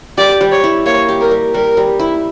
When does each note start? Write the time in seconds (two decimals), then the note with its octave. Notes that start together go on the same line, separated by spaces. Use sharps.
0.18 G4 D5
0.41 G3
0.52 C#5
0.63 E4
0.86 A#3 C#5
1.08 G4
1.20 A#4
1.31 G3
1.54 G3 A#4
1.77 G3
1.99 E4